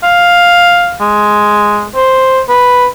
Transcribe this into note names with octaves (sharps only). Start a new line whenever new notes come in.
F5
G#3
C5
B4